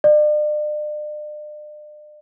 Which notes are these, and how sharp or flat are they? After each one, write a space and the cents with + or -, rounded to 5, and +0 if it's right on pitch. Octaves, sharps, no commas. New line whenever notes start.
D5 +40